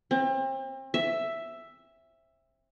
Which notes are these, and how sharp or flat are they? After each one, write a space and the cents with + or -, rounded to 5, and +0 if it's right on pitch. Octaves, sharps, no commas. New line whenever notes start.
C4 +35
E5 +5